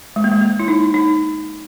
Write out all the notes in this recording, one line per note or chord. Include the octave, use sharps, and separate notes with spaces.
G#3
A#3
G#3
A#3
E4
D#4
D#4